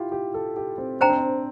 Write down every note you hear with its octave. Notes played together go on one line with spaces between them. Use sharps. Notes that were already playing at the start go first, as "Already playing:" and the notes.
Already playing: E4 F4 G4
G4
A4
G4
C4
D4 C5 G5 A#5
C4
D4